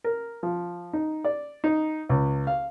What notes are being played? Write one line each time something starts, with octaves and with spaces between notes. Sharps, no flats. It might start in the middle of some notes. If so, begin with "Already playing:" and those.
A#4
F3
D#4
D5
D#4
C#2
F5